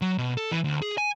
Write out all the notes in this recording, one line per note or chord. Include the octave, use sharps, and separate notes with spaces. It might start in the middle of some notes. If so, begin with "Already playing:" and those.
F#3
B2
A4
E3
D2
G#4
G#5